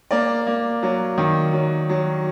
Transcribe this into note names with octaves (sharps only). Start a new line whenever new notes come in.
A#3 D5
A#3
F#3
D#3
F#3
F#3